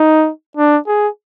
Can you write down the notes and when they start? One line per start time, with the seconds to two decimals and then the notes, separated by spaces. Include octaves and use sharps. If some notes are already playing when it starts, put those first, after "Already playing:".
Already playing: D#4
0.57 D4
0.87 G#4